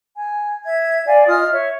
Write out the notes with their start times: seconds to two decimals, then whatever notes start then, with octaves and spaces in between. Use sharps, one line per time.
0.16 G#5
0.65 E5 G#6
1.07 D5 F5 G#5
1.28 F4 D#5 D#6 F6
1.52 C#5 E5